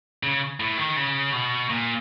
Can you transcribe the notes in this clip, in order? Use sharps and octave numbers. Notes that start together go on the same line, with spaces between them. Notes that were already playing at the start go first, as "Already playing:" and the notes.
C#3
A2
D#3
C#3
B2
A#2